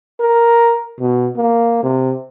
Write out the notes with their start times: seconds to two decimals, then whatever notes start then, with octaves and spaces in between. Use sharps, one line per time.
0.20 A#4
1.00 B2
1.36 A#3
1.83 C3